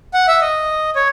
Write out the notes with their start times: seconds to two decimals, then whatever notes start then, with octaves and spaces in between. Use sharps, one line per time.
0.14 F#5
0.28 E5
0.41 D#5
0.96 C#5